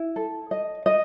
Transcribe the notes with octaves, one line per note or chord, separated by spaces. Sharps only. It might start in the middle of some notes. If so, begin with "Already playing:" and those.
Already playing: E4
A4
D#5
D#5